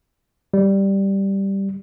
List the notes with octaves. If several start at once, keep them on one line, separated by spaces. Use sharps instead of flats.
G3